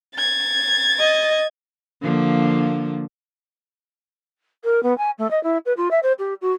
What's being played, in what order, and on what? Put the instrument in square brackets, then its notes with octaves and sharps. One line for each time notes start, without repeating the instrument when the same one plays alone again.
[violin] G#6 A6
[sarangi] D#5
[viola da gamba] D3 F3 A#3
[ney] A#4
B3
G#5
A3
D#5
E4
B4
F4
E5
C5
G4
F#4